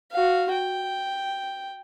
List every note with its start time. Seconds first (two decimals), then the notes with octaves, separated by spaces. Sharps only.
0.12 F#4 F5
0.52 G5